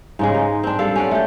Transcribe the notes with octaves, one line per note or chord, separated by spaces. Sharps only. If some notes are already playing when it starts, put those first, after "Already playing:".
G#2 C#3 G#3
D#4
C4 D4
G3 A4 F5
C#4 D5 F#5
A3 G4